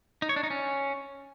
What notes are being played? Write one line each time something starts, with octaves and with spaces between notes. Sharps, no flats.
D#4
C#5
D4
D#4
C#4